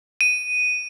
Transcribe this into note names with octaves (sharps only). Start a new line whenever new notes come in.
D#7